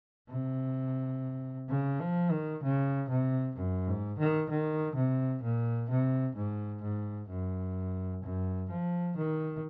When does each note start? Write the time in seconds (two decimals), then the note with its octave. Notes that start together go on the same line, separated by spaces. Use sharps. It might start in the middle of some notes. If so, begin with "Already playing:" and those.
0.30 C3
1.69 C#3
2.01 F3
2.31 D#3
2.63 C#3
3.09 C3
3.56 F#2
3.87 G#2
4.19 D#3
4.50 D#3
4.96 C3
5.43 A#2
5.90 C3
6.36 G#2
6.83 G#2
7.30 F#2
8.23 F#2
8.70 F3
9.16 D#3